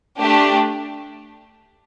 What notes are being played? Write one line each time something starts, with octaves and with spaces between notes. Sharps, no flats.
A3 D4 G4